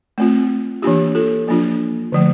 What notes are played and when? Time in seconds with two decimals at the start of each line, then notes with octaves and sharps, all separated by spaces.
0.18 A3 C4 F4
0.82 E3 A#3 D4 F4 G4
1.15 F4 A4
1.48 F3 A#3 D4 F4
2.12 D3 F3 A3